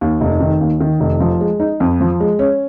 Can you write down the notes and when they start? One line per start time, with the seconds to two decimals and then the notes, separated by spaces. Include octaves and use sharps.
0.01 D#2
0.21 F1
0.40 D#3
0.61 D#2
0.80 D#3
1.00 F1
1.20 F3
1.41 G#3
1.60 D#4
1.80 F2
2.01 F3
2.20 G#3
2.39 C#4